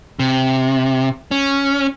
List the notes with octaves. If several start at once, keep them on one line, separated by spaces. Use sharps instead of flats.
C3
C#4